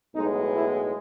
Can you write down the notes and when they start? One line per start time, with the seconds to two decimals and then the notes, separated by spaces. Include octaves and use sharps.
0.14 B1 A2 G#3 B3 D#4
0.53 E4